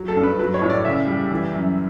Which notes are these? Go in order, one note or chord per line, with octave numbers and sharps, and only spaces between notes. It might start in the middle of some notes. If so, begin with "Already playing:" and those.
Already playing: F#3
A4
G2
B4
F#3 B4
C#5
A2
D5
C#3 E5
G3
E3
F#2